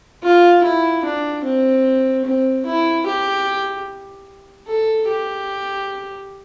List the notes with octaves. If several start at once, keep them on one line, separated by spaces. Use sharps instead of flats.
F4
E4
D4
C4
C4
E4
G4
A4
G4